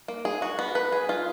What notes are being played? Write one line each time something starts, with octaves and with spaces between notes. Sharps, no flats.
A#3
G#4
F#4
B3
B4
G#4
F4